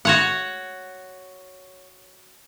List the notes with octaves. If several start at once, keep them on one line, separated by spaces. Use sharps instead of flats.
F#4 C#5 F#5